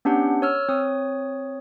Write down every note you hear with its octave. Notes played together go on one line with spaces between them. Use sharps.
B3 C#4 D4 G4 F#5
C#5 E6 F6
C4 C#5 D#6